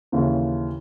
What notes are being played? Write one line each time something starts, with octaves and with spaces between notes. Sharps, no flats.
D#2 C#3 E3